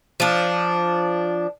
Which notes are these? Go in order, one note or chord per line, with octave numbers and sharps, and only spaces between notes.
F3 D4